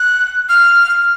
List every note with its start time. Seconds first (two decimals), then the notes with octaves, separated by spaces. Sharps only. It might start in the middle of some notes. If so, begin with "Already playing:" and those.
Already playing: F#6
0.49 F6